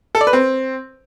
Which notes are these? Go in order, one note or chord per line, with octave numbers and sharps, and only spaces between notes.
A4
D5
B4
C4